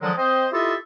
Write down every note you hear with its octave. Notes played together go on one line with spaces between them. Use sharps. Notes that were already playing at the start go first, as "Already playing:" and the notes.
D3 D#3 F3 F#3 G#3
C4 C5 D#5
E4 F4 G4 A4 D#5 E5